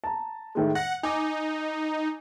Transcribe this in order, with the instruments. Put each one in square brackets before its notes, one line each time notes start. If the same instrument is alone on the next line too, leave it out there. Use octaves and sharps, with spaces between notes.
[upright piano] A5 A#5
A2 D#3 G#3
[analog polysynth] F#5 [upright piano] A#6
[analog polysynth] D#4 [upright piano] G#5 D6